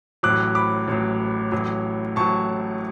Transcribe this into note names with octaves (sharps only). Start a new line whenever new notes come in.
A1 A2 F#3 D6 F#6
B5 D6
A1 A2 F#3
A1 A2 F#3
A1 A2 F#3 A5 C#6